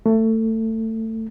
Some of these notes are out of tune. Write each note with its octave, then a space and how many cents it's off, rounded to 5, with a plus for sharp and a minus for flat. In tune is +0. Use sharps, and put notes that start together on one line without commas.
A3 +20